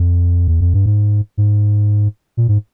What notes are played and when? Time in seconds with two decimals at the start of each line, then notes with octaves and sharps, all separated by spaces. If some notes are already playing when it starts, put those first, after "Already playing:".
Already playing: F2
0.48 E2
0.61 F2
0.74 G2
0.86 G#2
1.37 G#2
2.37 A#2
2.48 G#2